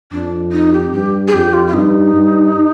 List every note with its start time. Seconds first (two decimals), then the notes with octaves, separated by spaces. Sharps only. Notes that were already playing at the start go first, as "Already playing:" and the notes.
0.12 F2 D4
0.52 D#4
0.73 G4
0.93 G2 G4
1.28 G#4
1.33 F2 G4
1.53 F4
1.67 F4
1.73 G2 D#4
2.14 G2